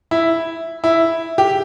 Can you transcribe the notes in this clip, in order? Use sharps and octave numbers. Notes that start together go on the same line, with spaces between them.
E4
E4
G4